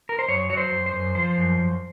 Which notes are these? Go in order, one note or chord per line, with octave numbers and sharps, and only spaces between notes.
A#4
C5
F#2 C#5
F#3 C#5
C5
F#2
C5
F#2
F3 C5
F#2
F#2